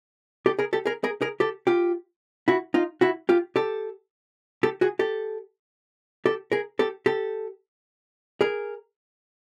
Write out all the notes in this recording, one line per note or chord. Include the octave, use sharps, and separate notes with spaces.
G4 A4
G#4 A#4
G4 A4
G#4 A#4
G#4 A#4
G#4 A#4
G4 A4
F4 G4
E4 F#4
D#4 F4
E4 F#4
F4 G4
G4 A4
G4 A4
F#4 G#4
G4 A4
G4 A4
G#4 A#4
G4 A4
G4 A4
G#4 A#4